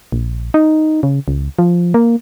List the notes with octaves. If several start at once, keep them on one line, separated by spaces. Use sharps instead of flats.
A#1
D#4
C#3
C#2
F3
A#3